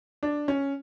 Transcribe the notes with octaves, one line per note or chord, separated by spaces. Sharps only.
D4
C#4